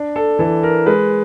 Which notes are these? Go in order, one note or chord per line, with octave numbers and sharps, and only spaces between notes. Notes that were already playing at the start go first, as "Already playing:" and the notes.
Already playing: D4
A4
E3 A4
A#4
G#3 B4